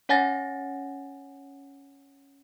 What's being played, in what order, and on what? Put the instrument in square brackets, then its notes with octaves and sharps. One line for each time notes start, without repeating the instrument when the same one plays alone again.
[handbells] C#4 C#5 F#5 G#5 A6 A#6